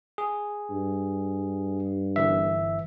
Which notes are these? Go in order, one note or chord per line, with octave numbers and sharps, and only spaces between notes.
G#4
G2
G1 E3 E5